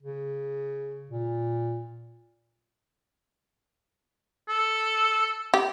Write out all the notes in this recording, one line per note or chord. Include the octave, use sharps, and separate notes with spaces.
C#3
A#2
A4
G4